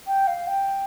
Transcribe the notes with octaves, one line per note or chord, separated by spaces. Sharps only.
G5
F5
G5